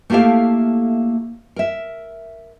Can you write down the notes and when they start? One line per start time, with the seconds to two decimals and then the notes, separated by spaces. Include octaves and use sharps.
0.10 A3 A#3 E4 G4 A4 F5
1.56 A#4 E5